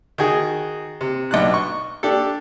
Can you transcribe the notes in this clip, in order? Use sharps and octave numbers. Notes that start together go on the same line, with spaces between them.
D#3 F#4 G#4
C3
B1 D4 F#6
C#6
D4 G4 A4